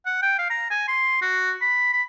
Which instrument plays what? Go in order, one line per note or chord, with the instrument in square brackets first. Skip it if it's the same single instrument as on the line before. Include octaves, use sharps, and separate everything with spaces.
[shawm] F#5
G5
F5
A#5
G#5
C6
F#4
B5
B5